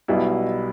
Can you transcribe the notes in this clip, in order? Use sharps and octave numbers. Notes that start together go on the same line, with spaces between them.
B1 B2 G3 B3 E4